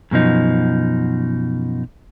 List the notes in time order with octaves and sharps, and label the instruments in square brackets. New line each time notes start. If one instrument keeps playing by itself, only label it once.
[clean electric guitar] F#2 B2 F3 D#4